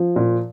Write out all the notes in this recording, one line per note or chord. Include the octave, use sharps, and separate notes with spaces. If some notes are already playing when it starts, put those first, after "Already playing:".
Already playing: F3
A#2